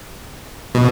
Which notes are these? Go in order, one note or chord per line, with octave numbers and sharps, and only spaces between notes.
B2